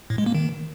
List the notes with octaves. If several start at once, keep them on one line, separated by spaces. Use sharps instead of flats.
A2
G#3
A#3
D#3